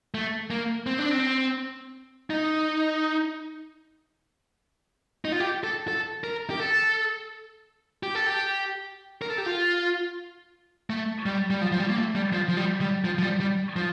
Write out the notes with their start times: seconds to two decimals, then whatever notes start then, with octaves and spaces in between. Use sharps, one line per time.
0.15 A3
0.50 A#3
0.87 C4
0.99 D4
1.11 C4
2.30 D#4
5.25 D#4
5.32 F4
5.40 G4
5.64 A4
5.88 A4
6.24 A#4
6.50 G4
6.60 A4
8.03 G4
8.15 A4
8.26 G4
9.22 A#4
9.30 A4
9.38 G4
9.46 F4
10.90 A3
11.26 G3
11.50 G3
11.62 F3
11.72 F3
11.80 G3
11.90 A#3
11.98 A3
12.15 G3
12.33 F3
12.49 F3
12.57 G3
12.81 G3
13.05 F3
13.18 F3
13.23 G3
13.40 G3
13.76 F3